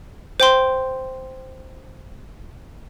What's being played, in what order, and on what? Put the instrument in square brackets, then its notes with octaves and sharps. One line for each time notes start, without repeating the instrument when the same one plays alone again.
[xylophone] C5 G5 C6